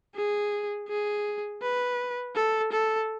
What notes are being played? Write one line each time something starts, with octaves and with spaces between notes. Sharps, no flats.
G#4
G#4
B4
A4
A4